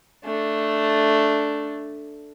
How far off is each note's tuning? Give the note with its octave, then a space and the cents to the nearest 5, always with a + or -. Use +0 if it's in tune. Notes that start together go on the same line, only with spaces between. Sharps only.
A3 +0 D4 +0